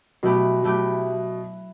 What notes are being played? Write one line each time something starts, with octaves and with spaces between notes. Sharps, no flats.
B2 F#3 A3 E4 G4
F#3 A3 E4 G4